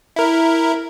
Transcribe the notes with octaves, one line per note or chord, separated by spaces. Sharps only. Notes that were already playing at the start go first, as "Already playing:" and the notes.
E4 A#4